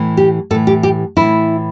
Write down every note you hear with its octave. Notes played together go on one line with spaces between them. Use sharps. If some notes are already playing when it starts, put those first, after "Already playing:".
Already playing: A2 E3
G4
A2 E3 A4
G4
G4
A2 E3 E4